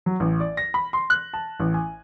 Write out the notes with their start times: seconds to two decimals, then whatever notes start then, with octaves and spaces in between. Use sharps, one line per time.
0.06 F#3
0.20 A1
0.40 D5
0.57 A#6
0.74 B5
0.93 C6
1.10 F#6
1.33 A5
1.60 A1
1.74 G#5